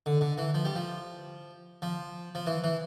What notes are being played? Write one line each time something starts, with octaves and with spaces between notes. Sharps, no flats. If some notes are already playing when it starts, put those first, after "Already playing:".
D3
D3
E3
F3
G3
F3
F3
F3
E3
E3